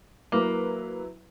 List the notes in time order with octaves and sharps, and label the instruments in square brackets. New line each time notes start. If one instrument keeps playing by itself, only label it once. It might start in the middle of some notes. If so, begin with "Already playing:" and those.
[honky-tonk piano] F#3 E4 B4 [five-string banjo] A#3